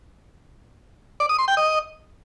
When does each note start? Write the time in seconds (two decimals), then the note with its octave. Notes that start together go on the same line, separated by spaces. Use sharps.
1.20 D5
1.29 D#6
1.39 C6
1.48 G5
1.57 D#5